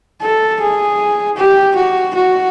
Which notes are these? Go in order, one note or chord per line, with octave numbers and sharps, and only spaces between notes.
A4
G#4
G4
F#4
F#4